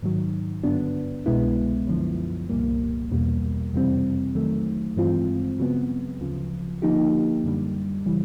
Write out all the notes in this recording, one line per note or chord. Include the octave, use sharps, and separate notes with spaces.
G#2 D#3 F#3
G2 D3 F#3 B3 D4
C2 B2 G#3 B3 E4
F#2 D3 F3
C2 A#2 G3 A#3
E2 B2 G3 A#3
F2 C3 E3 G3 C4
D#3 F#3 A3
G2 E3 G#3 C4 F4
C#3 F#3 B3
D2 C#3 F3
D3 F3 A#3 D#4 G4
F#2 D3 G3
C#3 E3 G3